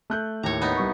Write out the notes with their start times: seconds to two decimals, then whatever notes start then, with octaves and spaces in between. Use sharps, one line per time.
0.10 A3 F#6 G6
0.43 D#2 A2 C#5 A#5
0.61 B3 D#4
0.77 C2 C#6